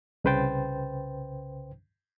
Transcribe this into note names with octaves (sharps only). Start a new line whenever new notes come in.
C2 C#3 B4 C5 G5 A6